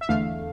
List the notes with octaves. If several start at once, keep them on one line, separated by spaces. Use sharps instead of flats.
E5
E2 D3 A3 F5